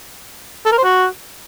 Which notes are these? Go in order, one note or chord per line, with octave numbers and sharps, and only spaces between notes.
A4
A#4
C5
F#4